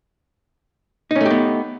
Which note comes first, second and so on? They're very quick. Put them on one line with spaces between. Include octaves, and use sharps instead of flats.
D#4 C#4 A3 G4 B3